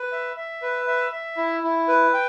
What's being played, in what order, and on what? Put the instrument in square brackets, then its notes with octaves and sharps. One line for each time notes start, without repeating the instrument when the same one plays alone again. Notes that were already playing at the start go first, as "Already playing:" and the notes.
Already playing: [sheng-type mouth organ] B4
E5
E5
B4
E5
E5
E4
E4
B4
G5